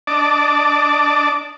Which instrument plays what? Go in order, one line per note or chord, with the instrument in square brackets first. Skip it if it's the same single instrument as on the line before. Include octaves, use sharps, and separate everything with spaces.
[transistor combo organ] D4 D5 D#5 A5 D6